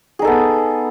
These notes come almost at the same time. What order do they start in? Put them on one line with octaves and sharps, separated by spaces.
G#4 D#4 A4 B3